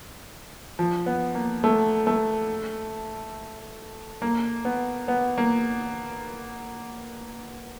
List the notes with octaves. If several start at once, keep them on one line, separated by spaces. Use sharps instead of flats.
F3
B3
A#3
A3
A3
A#3
B3
B3
A#3